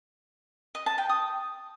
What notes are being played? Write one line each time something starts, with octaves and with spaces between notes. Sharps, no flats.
D#5
A5
G5
D#6